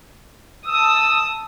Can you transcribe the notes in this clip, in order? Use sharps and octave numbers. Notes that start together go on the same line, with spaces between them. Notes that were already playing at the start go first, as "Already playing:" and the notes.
A5 D#6 E6